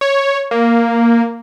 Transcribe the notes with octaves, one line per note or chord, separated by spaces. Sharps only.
C#5
A#3